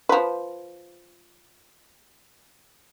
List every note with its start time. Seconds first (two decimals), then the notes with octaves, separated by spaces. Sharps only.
0.09 F3 B4